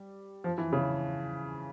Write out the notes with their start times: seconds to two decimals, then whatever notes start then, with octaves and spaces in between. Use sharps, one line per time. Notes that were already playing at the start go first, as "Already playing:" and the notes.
Already playing: G3
0.44 F3
0.58 E3
0.73 C#3